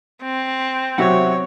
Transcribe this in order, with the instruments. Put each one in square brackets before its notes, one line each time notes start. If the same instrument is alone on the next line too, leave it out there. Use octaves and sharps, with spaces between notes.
[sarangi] C4
[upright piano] C3 F#3 [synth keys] C5 E5 F#5 [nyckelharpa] C#5